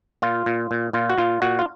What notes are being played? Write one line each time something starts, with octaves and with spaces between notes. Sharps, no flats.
A#2 F4
A#2
A#2
A#2 F4
F#4
A#2 F4
A#2 F#4
F4